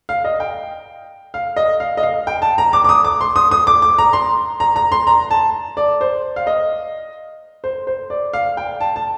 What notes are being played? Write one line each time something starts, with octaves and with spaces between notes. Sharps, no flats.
F5
D#5
G5
F5
D#5
F5
D#5
F5
G5
A5
A#5
D6
D6
D#6
D6
C6
D#6
D#6
D6
D6
A#5
C6
A#5
A#5
C6
A#5
A5
D5
C5
F5
D#5
C5
C5
D5
F5
G5
A5
A5